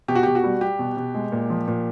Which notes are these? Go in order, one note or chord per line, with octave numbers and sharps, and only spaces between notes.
B2 G4
F#4
B2 G4
F#4
G3
G3 G4
B2
B2
G#3
A#2
F3
A#2